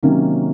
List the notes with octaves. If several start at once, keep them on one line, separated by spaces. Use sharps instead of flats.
C3 D#3 F#3 A#3 C#4